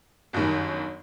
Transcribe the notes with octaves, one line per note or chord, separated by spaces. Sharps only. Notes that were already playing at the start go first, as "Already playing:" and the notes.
G1 F#2 D#3 G3